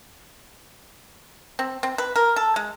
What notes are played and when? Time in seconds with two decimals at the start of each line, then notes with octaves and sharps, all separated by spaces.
1.59 C4
1.83 C4
1.98 B4
2.16 A#4
2.36 A4
2.56 G#3